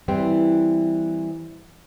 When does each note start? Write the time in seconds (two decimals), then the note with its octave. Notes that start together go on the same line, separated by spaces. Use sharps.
0.08 E3 G3 C4